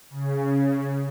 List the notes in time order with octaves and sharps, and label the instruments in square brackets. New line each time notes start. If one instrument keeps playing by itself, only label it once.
[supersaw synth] C#3